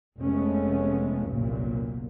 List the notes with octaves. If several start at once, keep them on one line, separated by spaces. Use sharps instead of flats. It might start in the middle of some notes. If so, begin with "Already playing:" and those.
F1 G#3 A3 B3 C#4
G1 C2 F#2 A#2